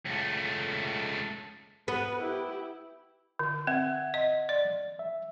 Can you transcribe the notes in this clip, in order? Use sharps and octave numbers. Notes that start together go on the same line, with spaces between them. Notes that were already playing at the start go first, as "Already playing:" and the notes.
C#2 A3
B3 B4
E4 G4
D3
C4 E5 F#5 G#6
D#5
D5
E5